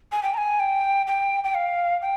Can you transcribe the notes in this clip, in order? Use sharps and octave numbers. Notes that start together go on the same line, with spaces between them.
G#5
G5
A#5
G#5
G5
G5
G5
F5
G5